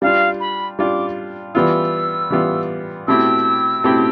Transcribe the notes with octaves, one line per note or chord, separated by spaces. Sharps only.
G3 D4 F4 F5
B5
G3 D4 F4 D6
E3 G3 B3 F4 E6
E3 G3 B3 F4
B2 A3 C4 E4 G4 E6
B2 A3 C4 E4 G4